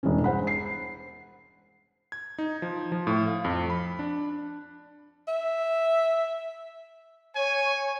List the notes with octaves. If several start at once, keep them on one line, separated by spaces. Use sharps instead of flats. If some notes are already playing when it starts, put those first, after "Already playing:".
E1 G2 E3 C#4
C5 F#5 B5
C7
G#6
D#4
F3
F3
A2
F5
F2
B5
D4
E5
C#5 G#5